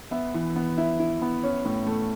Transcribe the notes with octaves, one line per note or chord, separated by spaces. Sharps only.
B3 E5
E3
B3
E4 E5
E4
B3
C#4
A2
A3